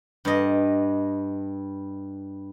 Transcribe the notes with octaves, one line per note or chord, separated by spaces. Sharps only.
G2 D#5